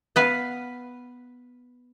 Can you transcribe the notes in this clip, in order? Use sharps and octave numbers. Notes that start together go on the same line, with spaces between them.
B3 B4 F5